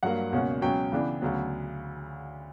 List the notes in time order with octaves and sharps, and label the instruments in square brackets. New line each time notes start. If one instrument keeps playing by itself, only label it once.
[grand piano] G2 F#3 A#3 F#5
C#2 B2 A#3 C#4
C#2 B2 F#3 C#4 G5
C#3 E3 B3 D4
D2 C#3 F#3 B3